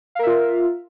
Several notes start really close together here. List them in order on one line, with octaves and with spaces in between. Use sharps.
F5 A#4 E5 F4